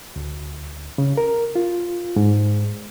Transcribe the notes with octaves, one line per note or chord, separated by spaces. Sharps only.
D2
C#3
A#4
F4
G#2